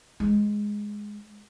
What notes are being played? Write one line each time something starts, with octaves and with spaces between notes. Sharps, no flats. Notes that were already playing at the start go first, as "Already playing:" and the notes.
G#3